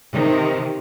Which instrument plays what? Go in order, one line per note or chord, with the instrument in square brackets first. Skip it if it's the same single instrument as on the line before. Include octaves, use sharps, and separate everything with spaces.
[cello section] C3 D#3